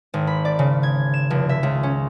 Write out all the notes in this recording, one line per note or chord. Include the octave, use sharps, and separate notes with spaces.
G#1
B5
D5
C#3
G#6
E7
F1
E5
C#2
C#4